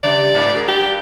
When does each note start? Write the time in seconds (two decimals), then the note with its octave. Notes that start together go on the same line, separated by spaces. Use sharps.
0.03 C#3 G3 D5
0.34 G#2 C4 D4
0.54 F#4 G#4 A#4
0.68 G3 G4
0.81 G2